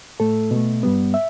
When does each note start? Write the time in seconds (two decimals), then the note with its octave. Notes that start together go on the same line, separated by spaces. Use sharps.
0.20 A2 A3 A4
0.51 B2
0.56 A3
0.83 G2 G3 B3
1.14 E5